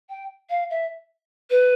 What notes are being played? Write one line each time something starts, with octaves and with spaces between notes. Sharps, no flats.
G5
F5
E5
B4